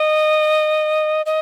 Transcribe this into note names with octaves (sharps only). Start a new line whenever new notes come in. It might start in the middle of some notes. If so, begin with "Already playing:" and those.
Already playing: D#5
D#5